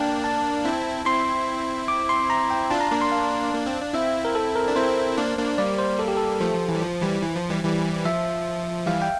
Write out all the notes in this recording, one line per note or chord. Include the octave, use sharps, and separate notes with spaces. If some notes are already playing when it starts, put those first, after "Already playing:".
Already playing: A#3 D4 G5 A5
A5
C4 E4
C4 E4 C6
D6
C6
A#5
G5
D4 F4 A5
A#5
A#3 D4
C6
F5
A#3
C4
D4
C4 E4 E5
A#4
A4
A#4
D4
C4 E4 C5
A#3 D4
A#3 D4
G3 A#3 D5
C5
A4
G4
A4
F3 A3 C5
F3
E3
G3
F3
E3 G3
E3
F3
E3 G3
E3 G3
F3 E5
E3 G3 F5
G5